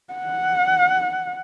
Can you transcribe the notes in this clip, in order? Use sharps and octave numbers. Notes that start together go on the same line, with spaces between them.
F#5